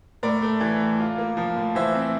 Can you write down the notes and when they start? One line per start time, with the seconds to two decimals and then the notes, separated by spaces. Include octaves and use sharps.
0.23 A2 A#4 D5
0.42 A3
0.60 E3
0.80 A2
1.00 F4
1.18 A#3
1.37 F3
1.56 A2
1.75 E3 C5 E5
1.95 C4